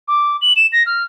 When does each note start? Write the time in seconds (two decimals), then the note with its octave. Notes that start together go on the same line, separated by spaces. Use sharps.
0.08 D6
0.41 F#7
0.56 E7
0.73 A#6
0.86 F6